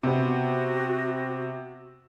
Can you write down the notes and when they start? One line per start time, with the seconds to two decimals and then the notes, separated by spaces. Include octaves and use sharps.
0.03 C3 B3 F#4